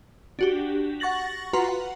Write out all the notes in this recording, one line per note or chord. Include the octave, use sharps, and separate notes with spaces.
D4 F#4 G4
F#5 C#6 A6 A#6 F#7
F4 F#4 B4 F#5 A#5 C6
F#5